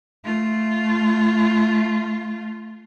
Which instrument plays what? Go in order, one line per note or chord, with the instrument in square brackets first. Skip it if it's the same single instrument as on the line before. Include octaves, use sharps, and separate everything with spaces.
[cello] A3 F4